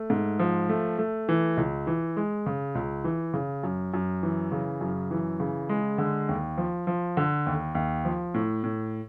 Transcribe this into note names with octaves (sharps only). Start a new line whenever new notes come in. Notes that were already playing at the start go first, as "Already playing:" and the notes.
Already playing: A3
G#2
F3
A3
A3
E3
C#2
E3
G#3
C#3
C#2
E3
C#3
F#2
F#2
E3
C#3
F#2
E3
C#3
G#3
D3
D#2
F3
F3
D3
D#2
D#2
F3
A2
A2